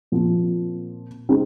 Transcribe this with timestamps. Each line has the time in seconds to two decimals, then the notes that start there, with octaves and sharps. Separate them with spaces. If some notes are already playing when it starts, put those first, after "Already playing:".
0.12 A#2 F3 C4
1.29 G#3 C4 D#4